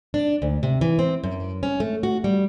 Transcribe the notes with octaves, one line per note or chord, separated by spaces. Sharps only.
D4
D2
C3
E3
C4
F#2
C#4
A3
F#4
G3